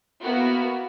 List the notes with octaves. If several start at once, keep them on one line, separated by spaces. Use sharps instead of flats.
A#3 B3 E4 F#4